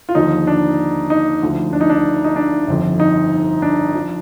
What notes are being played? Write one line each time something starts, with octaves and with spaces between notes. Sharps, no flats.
F4
D#2 D3 F3 D#4
D4
D#4
D2 D3 F3
D4
D#4
D4
D#4
D4
G1 F2 D3
D#4
D4
F3